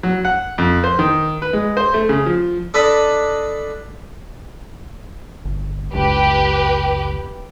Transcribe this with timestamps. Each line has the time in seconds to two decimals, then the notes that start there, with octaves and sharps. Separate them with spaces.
0.03 F#3
0.25 F#5
0.58 F2
0.84 C5
0.99 D#3
1.42 B4
1.53 G#3
1.77 C5
1.94 A3
2.09 C#3
2.26 F3
2.74 D4 A4 D#5 B5
5.45 G1
5.93 F#1 C#2 G4 B4